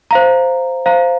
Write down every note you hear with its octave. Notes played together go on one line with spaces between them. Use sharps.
C5 F5 A#5
C5 F5 A#5